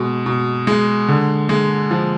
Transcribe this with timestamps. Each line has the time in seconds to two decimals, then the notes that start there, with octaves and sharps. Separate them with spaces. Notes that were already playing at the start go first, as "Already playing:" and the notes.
Already playing: B2 G#3
0.26 B2
0.67 G#3
1.08 D3
1.49 G#3
1.91 F3